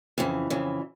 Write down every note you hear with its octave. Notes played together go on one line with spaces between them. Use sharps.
F2 C#3 E3
F2 C#3 E3